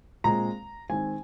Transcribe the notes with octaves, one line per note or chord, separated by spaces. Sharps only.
A#2 G#3 C4 A#5
D#3 G#3 C4 G#5